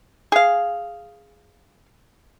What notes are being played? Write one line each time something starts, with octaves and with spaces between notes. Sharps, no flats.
G#4 F5